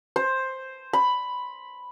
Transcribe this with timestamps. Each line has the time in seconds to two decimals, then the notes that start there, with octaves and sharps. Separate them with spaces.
0.16 C5
0.93 B5